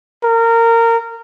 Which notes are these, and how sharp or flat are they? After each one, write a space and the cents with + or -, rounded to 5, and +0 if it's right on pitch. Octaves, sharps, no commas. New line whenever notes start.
A#4 -20